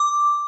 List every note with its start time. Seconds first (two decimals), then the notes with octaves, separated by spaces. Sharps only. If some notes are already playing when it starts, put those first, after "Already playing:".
Already playing: D6